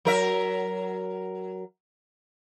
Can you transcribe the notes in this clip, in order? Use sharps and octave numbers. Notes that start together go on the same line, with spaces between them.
F#3 A#4 E5